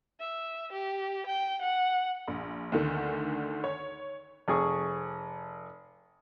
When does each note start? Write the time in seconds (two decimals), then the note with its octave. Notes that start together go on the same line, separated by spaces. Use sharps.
0.20 E5
0.73 G4
1.27 G5
1.62 F#5
2.28 A#1
2.72 D2 D3 D#3
3.64 C#5
4.48 F1 G#4 C#6